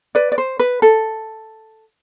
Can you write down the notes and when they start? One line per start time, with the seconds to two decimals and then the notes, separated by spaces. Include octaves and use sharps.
0.15 B4 D5
0.32 D5
0.38 C5
0.59 B4
0.82 A4